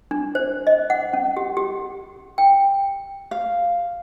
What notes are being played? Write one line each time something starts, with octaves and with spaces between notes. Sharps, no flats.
D4
C5
D#5
F#5
C#4
G4
G4
G5
F5